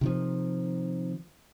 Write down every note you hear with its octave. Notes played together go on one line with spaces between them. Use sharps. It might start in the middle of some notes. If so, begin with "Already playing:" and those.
C3 D#3 F3